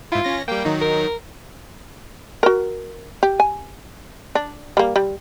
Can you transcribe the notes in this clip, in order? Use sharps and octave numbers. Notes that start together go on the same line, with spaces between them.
G#2 E4 F4
C#4 A#6
G3 A#3 G5
D#3 F#3 D#4
A#4
F#4 A#4
G4
G#5
D4
G3 A#3
G3